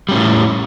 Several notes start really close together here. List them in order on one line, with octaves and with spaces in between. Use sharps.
G3 C#4 A2